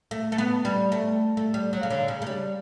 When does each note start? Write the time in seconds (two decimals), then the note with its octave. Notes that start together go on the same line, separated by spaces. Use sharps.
0.11 A3
0.32 A3
0.38 B3
0.65 G3
0.92 A3
1.37 A3
1.54 G3
1.73 F#3
1.83 C#3
1.90 D3
2.08 C#3
2.22 A3
2.26 G3